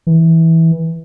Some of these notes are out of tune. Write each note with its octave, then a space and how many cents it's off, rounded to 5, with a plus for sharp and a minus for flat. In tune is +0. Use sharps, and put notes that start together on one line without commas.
E3 -15